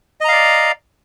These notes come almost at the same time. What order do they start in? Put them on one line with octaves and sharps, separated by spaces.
D#5 A#5 F5 D5